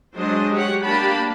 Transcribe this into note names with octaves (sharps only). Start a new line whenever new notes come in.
F#3 G#3 D4 C5 D#5
G4 C#5 F#5
A#3 D4 G4 A5 B5